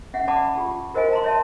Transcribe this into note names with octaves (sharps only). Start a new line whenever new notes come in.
C#4 E5 F#5
D5 F#5 A5 B5 D6
F4 G4
F#4 A#4 C5 D#5 F5 G#5
A5 A#5 C6
C#5 E5 A5